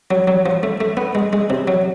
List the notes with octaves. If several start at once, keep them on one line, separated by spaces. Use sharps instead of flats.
F#3
F#3
F3
A3
A3
B3
G#3
G#3
C3
F#3